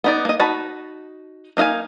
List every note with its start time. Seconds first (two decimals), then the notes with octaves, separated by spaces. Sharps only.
0.04 B3 D#4 D5
0.25 A#3 D#5
0.40 D#4 F#4 A5 B5
1.57 A#3 D#4 D#5 F5 G#5